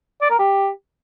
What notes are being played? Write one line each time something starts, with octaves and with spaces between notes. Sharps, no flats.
D5
A#4
G4